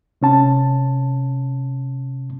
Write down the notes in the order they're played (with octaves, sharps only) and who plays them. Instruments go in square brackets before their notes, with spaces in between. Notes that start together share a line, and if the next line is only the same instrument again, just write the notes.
[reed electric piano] C3 C#4 A5